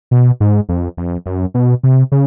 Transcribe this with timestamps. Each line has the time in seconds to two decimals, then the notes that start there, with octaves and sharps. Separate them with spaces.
0.11 B2
0.40 G#2
0.69 F2
0.97 F2
1.26 F#2
1.54 B2
1.83 C3
2.12 C#3